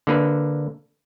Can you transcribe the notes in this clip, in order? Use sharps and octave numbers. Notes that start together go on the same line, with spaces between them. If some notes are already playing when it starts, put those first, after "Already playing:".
D3 A#3 B4